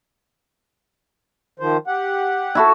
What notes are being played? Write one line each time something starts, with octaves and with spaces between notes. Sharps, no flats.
D#3 F3 C5
G4 F#5
E4 F#4 A4